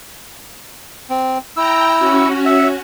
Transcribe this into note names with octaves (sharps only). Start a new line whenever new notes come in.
C4
E4 G5 A#5 E6
C#4 F#4
E5